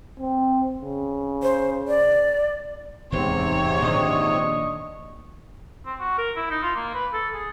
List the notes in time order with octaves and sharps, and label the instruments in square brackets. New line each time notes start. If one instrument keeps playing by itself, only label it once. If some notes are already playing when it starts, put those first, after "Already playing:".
[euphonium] C4
C#3
[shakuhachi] C5
D5
[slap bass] D1 E2 [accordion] G#2 C3 C4 [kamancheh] C#5
[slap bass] A#2 D#3 F3 [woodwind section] D4 D#5 C#6
[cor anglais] C4
F#4
A#4
E4
D#4
F4
A#3
B4
A4
G#4